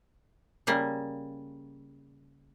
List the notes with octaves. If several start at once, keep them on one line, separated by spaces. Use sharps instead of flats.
C#3 G3 A#3